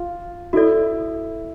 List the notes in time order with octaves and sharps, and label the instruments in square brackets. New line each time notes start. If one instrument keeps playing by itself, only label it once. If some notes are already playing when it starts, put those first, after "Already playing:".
Already playing: [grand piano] F4
[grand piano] E4 [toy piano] F#4 A4 D5